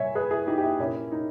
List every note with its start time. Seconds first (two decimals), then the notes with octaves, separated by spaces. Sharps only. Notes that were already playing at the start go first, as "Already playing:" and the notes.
Already playing: A#2 G3 C#5 E5 G#5
0.15 G#4 B4
0.31 E4 G#4
0.47 D#4 G4
0.58 G4
0.63 E4
0.79 A#2 A#3 C#4 E4
1.12 D#4